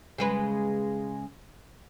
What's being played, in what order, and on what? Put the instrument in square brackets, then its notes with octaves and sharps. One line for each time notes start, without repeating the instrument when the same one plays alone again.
[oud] C#3 G#3 B4